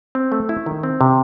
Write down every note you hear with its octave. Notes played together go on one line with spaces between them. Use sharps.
C4
A3
E4
D#3
C4
C3